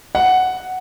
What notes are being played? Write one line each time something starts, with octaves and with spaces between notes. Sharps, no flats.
F#5